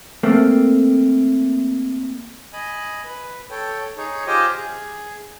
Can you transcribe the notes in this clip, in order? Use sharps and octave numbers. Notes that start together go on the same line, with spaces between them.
A3 A#3 C4
D#5 G#5 B5
B4
A4 C#5 G5
D#4 G#4 C#5
F4 G4 C5 D#5 G5 G#5
G#4